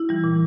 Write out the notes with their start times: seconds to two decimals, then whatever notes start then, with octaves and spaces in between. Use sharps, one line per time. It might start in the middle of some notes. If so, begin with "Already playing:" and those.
Already playing: E4
0.09 E3 G3
0.24 A#2